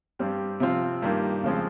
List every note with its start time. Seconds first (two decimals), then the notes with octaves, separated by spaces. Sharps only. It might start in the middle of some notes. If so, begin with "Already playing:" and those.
0.19 G2 G3 C4 G4
0.60 C3 F3 C4 F4
1.02 G2 D#3 G3 A#3
1.43 F2 C#3 F3 G#3 C4